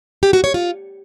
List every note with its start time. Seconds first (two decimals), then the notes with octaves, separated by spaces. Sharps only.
0.23 G4
0.33 F#4
0.44 C#5
0.54 F4